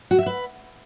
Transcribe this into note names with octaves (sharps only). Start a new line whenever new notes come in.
F#4
E5
B4